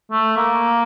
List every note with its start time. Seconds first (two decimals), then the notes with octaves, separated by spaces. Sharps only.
0.11 A3
0.36 A#3